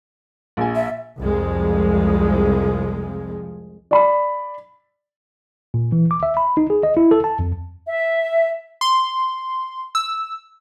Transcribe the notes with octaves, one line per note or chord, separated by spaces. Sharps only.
A#1 G#5
E5
C2 F2 F3 G#3
D5 B5
A#2
E3
D6
E5
B5
D#4
G#4
D#5
E4
A4
A5
F2
E5
C6
E6